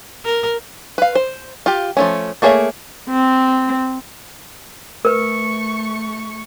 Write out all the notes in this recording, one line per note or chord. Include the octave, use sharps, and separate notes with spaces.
A#4
B4 F5
C5
F4 G4
F3 A3 C#4
A3 A#3 G#4 C#5 E5
C4
A3 A#4 B4 C#6